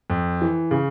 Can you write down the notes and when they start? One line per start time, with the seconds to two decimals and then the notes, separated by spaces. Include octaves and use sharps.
0.10 F2
0.41 E3
0.71 C#3